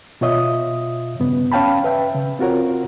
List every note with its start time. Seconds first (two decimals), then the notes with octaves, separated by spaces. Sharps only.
0.21 B2 F4 C#5 D#5 E5 D#6
1.20 G2 C#3 B3
1.52 C#4 C#5 F5 G5 A5 B5
1.84 B4 E5 G5
2.14 C#3
2.39 C4 F4 F#4 A#4 C#5